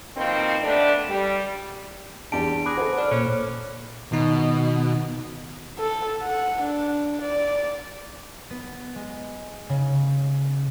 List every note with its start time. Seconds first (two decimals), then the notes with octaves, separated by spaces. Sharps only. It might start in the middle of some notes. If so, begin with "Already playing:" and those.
0.17 B2 D#3 F3 A#3 C4
0.63 G3 A3 B3 D4
1.09 G3
2.32 E2 G3 D4 A5 D7
2.66 G#4 B5 D6 F#6 A#6
2.77 A4 B4 C5 F#5
2.98 D4 F6
3.11 A#2 C#4
4.12 B2 D#3 D#4
5.79 A4
6.22 F#5
6.62 D4
7.22 D5
8.50 B3
8.96 G#3
9.69 C#3